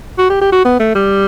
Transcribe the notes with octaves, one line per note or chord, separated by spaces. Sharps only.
F#4
G4
G4
F#4
B3
A3
G3